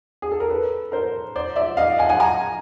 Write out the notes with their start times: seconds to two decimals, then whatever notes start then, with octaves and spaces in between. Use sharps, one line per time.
0.22 G#4
0.32 A4
0.40 A#4
0.49 A4 B4
0.92 A#4 C5
1.36 C5 D5
1.56 D5 E5
1.77 D#5 F5
1.98 F#5 G#5
2.09 F#5 G#5
2.20 G#5 A#5